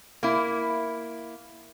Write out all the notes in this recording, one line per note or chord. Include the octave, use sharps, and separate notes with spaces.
A#3 E4